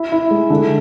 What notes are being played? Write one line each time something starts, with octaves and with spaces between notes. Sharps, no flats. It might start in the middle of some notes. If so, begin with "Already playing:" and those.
Already playing: E4
E4
G#3
D3